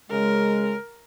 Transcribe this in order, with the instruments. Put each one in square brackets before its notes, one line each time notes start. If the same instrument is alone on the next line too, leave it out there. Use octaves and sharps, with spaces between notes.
[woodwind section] C#3 G#3 [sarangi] A#4